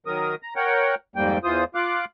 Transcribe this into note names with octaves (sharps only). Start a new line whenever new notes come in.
D#3 F#3 A#4 D#6
A#5
A#4 C#5 F#5 G5
F2 G#2 G3 A#3 G5
E2 E3 F4 C5 D#6
F4 F5 D6 F#6